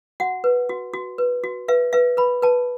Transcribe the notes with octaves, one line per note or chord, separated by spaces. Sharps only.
F#4 F#5
B4
F#4
F#4
B4
F#4
B4 E5
B4 E5
B4 B5
B4 A5